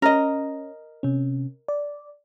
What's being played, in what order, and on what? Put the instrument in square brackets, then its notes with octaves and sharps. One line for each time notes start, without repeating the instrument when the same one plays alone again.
[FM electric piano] C#4 [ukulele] A#4 D#5
[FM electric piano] C3 C#4
D5